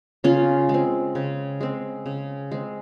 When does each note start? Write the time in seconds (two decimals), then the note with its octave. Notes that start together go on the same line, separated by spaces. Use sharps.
0.24 C#3 C#4 F4
0.69 G#3 C4
1.15 C#3
1.61 G#3 C4
2.06 C#3
2.51 G#3 C4